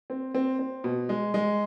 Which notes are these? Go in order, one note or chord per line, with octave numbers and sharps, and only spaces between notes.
C4
C4
C4
B2
G#3
G#3